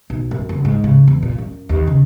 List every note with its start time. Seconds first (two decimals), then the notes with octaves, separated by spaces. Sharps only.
0.10 B1
0.31 F#2
0.49 F#1
0.65 G#2
0.84 C#3
1.08 E2
1.23 A#2
1.38 F#2
1.69 D#2
1.87 C#3